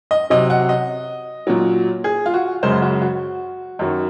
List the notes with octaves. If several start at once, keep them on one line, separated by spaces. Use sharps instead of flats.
D#5
C3 F#3 D#5
F#5
D#5
A#2 F#3
G#4
F4
F#4
F#2 C#3 G#3 C5
F#4
F#4
F#2 D#3 F#3